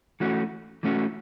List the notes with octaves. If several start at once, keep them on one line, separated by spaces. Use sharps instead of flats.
E3 A3 C#4 F#4
E3 A3 C#4 F#4